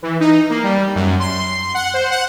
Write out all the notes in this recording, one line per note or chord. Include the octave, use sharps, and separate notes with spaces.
E3
D#4
A#3
G3
F#2
C6
F#5
C5
F#5